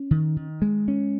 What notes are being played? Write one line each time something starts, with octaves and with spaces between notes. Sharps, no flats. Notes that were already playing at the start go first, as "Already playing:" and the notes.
Already playing: C#4
D#3
D#3
G#3
C#4